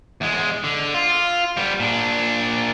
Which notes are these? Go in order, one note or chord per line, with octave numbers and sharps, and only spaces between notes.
E2 G#3
D3
F4
G3 B3
A#2 D4